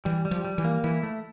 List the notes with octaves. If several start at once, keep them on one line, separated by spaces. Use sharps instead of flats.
E3 G3
G3
F3
G3
E3
A#3
E3 E4
A3